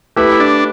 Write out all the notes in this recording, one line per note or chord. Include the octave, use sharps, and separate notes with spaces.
A3 E4 G4 B4
D4